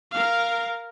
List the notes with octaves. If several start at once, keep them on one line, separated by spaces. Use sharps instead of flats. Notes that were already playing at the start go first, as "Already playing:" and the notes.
A#4 F5